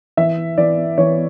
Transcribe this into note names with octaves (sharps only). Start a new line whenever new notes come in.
E3 E5
E3 D5
E3 C#5